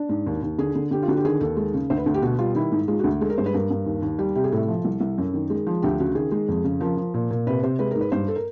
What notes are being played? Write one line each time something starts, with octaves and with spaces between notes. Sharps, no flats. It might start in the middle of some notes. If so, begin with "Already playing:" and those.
Already playing: D4
G#2
D#2
D#2
D3 G#4
D3
D3 G4
F4
D3 F#4
G4
D#3 G#4
D#2 A4
G#3
C#3
D2 C5
B4
D2 A4
G4
B2 F#4
G3 F4
D#3 E4
G#2
G#3 F4
F#4
D2
G#3 A4
A#4
G2 C5
B4
G2 A#4
G2
D#2
D#2
G3
C3 G4
G#4
A2 A4
F3
C2
C2
F#2
D#3
G#3
F3
D2 G4
C#3 F#4
D#3 G#4
G#3
F2
C#3
F3 A#4
F3
A#2
A#2
C3 B4
C3 C5
G#3 B4
A#4
G#2
B4
G2 C5
A4
A#4